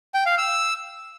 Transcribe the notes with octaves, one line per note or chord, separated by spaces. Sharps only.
G5
F5
E6